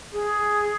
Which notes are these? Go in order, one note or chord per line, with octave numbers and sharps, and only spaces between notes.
G#4